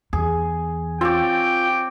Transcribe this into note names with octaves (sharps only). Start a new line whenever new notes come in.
E2 G#4
C4 F4 C#5 D5 G5